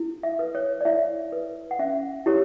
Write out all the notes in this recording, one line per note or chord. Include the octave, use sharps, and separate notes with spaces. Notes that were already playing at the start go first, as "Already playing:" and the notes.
Already playing: E4
E5
B4
C#5
D5
E4 E5
B4
F#5
C#4 E5
E4 G4 C#5